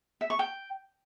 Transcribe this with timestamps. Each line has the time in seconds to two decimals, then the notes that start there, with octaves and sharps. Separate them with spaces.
0.21 E5
0.30 C#6
0.39 G5